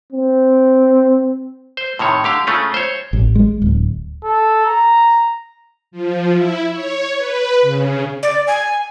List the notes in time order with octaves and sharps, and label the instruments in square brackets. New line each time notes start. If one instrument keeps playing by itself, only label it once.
[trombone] C4
[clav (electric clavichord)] C5
A2 C3 D#3 C#5
D3 G4 F5
C#3 A3 C#4 F4
C5 C#5
[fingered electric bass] A1
G#3
D1
[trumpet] A4
A#5
[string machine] F3
E4
C#5
B4
C#3
[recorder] D5
G#5